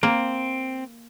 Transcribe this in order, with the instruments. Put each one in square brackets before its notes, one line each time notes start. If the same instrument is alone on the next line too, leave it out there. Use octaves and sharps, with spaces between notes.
[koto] A#3 [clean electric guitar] C4